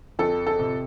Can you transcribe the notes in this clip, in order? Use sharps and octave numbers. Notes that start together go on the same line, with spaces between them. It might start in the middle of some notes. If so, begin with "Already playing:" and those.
F2 A4
A4
C3